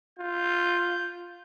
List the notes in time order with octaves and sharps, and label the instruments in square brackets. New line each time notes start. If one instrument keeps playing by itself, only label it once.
[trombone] F4 [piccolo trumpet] G6